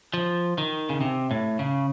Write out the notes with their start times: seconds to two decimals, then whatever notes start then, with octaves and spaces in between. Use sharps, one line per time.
0.14 F3
0.58 D#3
0.89 C#3
1.01 C3
1.31 A2
1.59 C#3